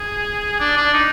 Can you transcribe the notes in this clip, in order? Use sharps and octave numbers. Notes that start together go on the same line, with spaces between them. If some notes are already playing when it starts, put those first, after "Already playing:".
Already playing: G#4
D4
D4
D#4